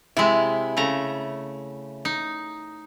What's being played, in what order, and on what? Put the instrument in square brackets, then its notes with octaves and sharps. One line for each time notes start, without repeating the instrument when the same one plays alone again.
[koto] C3 G#3 [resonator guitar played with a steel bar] E4
[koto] C#3 A3 A#5
D#4